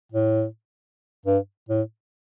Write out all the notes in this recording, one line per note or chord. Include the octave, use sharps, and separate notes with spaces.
A2
G2
A2